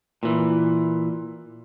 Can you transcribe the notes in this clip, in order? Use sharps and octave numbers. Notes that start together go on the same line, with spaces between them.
A#2 E3